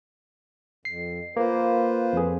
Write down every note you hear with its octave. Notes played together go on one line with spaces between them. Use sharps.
F2 C7
A#3 F4 B4 C5
F2 G#4